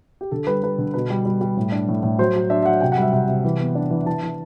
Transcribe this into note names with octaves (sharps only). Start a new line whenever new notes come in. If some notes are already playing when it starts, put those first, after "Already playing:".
G4
D3 A4
G3 B4
G3 B4
D3
B2 B4
G3
G3
G3
A2
D4
A2
A2
F#3 C5
F#3
D4 E5
E5
F#3 F#5
C3 G5
F#5
G3 E5
C3 F#5
C3
E3
B3
D4
E3
E3 A5
E3